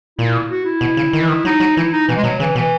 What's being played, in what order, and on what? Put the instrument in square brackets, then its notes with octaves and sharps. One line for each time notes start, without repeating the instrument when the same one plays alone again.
[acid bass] A#2 [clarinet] E4
[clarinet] E4
F#4
E4
[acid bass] B2
C#3
D#3
E3
D#3
[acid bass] F#3 [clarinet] D#4
[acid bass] F#3
[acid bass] E3 [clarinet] E4
[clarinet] D#4
[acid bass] B2 [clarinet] E3
[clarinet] G#3
[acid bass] B2 [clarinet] F#3
[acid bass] C#3 [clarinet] E3
[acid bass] B2 [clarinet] E3